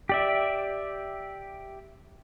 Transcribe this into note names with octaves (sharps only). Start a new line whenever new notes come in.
G4 D5 E5